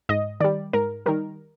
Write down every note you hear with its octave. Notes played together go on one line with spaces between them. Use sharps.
G#2 D#5
D#3 G3 D5
G#2 A#4
D#3 G3 A#4